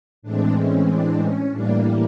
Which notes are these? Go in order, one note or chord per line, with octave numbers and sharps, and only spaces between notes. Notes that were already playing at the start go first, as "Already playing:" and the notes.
A2 E3 G#3 C4 D4
C#4
D4
C#4
A2 E3 G3 A#3 D4